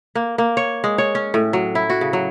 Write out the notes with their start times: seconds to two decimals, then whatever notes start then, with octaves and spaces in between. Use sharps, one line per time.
0.15 A#3
0.38 A#3
0.57 C#5
0.84 G#3
0.98 C#5
1.15 C#4
1.34 A2
1.53 F#3
1.75 E4
1.90 F#4
2.01 C#3
2.13 F#3